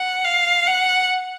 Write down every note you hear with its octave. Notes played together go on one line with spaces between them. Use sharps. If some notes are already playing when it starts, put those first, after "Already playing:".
Already playing: F#5
F5
F#5